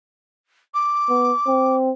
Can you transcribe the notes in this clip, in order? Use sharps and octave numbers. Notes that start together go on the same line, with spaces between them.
D6
B3
C4